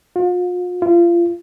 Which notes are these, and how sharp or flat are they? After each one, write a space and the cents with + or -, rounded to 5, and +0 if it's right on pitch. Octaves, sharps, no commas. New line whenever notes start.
F4 +40
F4 -30